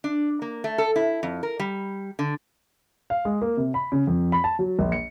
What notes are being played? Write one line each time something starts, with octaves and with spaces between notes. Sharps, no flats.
D4
A#3
A3
A4
E4
F2
A#4
G3
D3
F5
G#3
A#3
C3
B5
C#3
F2
B5
A5
F#3
A#1
C#7